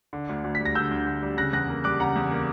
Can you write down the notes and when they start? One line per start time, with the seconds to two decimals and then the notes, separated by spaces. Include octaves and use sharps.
0.13 D3
0.29 D2
0.44 D2
0.55 B6
0.60 G3
0.65 A#6
0.75 D3 E6 G6
0.91 D2
1.07 D2
1.23 G3
1.37 C#3 F#6 A#6
1.53 E2 F#6 A#6
1.68 A#3
1.84 G3 D6 F#6
2.00 C#3 F#5 A#5
2.16 E2
2.31 A#3